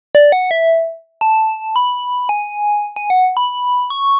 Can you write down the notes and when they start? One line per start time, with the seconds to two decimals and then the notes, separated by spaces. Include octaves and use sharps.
0.15 D5
0.32 F#5
0.51 E5
1.21 A5
1.76 B5
2.29 G#5
2.96 G#5
3.10 F#5
3.37 B5
3.90 C#6